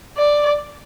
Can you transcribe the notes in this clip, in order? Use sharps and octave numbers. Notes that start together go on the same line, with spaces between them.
D5